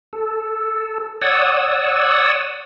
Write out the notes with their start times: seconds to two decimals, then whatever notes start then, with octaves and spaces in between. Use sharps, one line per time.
0.13 A4
1.22 C#5 D5 F#5 D#6 E6